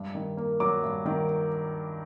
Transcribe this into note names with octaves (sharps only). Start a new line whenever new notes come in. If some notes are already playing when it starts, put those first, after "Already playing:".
Already playing: G2
D#3
A#3
F#3 D6
G2
D#3